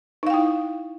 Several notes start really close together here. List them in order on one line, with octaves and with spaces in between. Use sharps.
D#4 F5 G5 E4